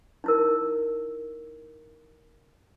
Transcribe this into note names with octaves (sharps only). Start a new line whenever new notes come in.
D#4 E4 A#4